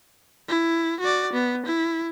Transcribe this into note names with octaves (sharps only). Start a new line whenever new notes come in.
E4
F#4 D5
B3
E4